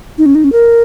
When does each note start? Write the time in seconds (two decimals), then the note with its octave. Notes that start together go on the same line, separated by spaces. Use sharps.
0.18 D#4
0.26 C#4
0.35 D#4
0.44 C#4
0.52 A#4